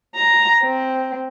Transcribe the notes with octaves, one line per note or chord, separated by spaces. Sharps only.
A#5
C4